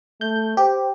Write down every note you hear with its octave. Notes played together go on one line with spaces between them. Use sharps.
A3 G6
G4 C5